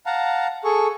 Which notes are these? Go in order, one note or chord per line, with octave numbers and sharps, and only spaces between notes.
F5 F#5 A5 A#5
G#4 A4 C#6